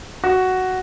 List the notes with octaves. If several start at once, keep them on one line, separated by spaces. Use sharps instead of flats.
F#4